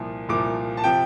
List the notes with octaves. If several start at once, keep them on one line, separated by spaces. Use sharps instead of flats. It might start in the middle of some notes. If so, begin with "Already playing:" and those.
Already playing: C2 A#2 F3
C2 A#2 F3 D6
A5
C3 F3 G5